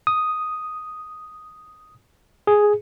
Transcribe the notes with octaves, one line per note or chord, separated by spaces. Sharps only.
D#6
G#4